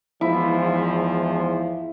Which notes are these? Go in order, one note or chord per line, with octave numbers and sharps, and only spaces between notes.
E2 G#2 F3 E4